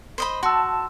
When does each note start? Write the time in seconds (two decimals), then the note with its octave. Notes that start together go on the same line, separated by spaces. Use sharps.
0.18 C5 D#5 B5
0.43 F#4 A5 C6 E6